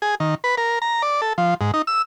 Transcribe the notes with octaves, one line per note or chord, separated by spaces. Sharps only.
G#4
D#3
B4
A#4
A#5
D5
A4
F3
G#2
D#4
E6